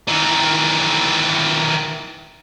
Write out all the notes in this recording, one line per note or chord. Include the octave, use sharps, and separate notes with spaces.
D#3 E3